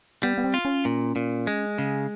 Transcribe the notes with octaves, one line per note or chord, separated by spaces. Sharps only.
G3 B3
B3
C4
F4
C#4
A#2
A#2
G#3
C#3